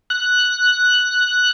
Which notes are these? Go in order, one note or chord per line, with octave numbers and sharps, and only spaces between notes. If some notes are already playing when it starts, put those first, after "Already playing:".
F#6